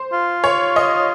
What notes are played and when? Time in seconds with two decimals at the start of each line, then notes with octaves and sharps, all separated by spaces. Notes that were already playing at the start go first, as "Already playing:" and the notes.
Already playing: C5
0.13 F4
0.44 C#5
0.76 D#5